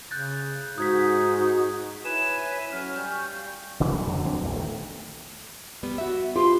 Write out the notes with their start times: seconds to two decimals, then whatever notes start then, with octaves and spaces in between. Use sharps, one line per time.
0.11 C#3 F#6 G6 A6
0.78 G#2 D#4 F#4 D#6 G#6 B6
2.05 E4 B4 C#5 E5 G#5 E7
2.52 B6
2.72 F#3 C#4 A4 F6
2.96 G3 G#5 C#6 G6
3.30 F5
3.80 D#1 C#3 E3 G#3
3.93 F#3 G3 A3
4.07 F2 D3 F#3
4.25 E2 F#3 C4 D4
4.42 A#1 E2 A#2 G3
4.56 D#3 A3
5.83 G3 B3
5.98 F#4 E5
6.36 F4 G4 B4 C6